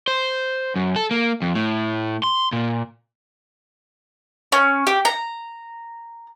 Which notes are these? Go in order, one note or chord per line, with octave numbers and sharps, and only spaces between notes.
C5
F#2
A4
A#3
F2
A2
C6
A#2
C#4
G4
A#5